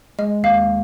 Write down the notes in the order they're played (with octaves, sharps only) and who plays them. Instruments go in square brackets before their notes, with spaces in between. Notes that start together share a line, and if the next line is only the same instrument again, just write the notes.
[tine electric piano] G#3 [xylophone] D#5
[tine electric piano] D#2 [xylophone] F5